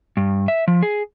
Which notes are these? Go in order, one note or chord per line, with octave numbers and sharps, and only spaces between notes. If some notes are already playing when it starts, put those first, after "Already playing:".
G2
E5
F3
G#4